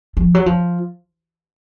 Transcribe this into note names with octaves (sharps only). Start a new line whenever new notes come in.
F3
F#3
F3